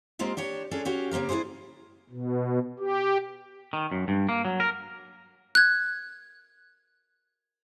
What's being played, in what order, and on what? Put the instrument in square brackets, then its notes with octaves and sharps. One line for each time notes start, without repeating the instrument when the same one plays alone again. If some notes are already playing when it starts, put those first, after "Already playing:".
[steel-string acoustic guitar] G#3 A#3 C4 F4 G4
D4 G4 C#5
C#4 D4 F4 G#4 A4
C#4 F#4 G4 F5
C#3 A#3 C4 G4 A#4
D4 E4 F#4 G#4 C5
[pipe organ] B2
G4
[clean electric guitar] D#3
F#2
G2
A#3
F#3
A#4
[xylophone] F#6 G#6